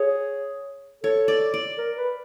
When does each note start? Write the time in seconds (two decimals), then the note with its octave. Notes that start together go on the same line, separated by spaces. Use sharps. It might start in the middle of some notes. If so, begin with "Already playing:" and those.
Already playing: G#4 C#5
1.03 A4 C#5
1.28 D5
1.54 D5
1.78 A#4
1.97 B4